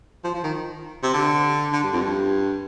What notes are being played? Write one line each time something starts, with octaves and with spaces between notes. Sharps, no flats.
F3
F3
D#3
C3
D3
D3
G2
F2
G2